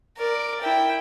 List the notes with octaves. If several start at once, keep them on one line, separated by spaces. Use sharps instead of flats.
A#4 D5
E4 G5